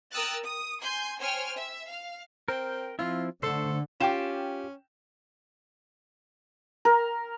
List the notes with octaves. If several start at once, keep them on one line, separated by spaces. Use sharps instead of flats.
A#4 G5 D#6 E6 F#6 A6
D#6
G#5 C6 G6
C5 C#5 G5 G#5 C6 F6
E5
F5
C4 A#4 G5
F3 C4 E4 F4
D3 A3 A4 C5
C#4 F4 G4 G5 E7
A#4